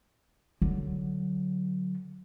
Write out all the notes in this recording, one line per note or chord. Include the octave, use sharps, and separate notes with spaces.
D3 F#3